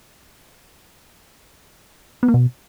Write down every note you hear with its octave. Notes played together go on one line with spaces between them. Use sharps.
B3
A#3
B2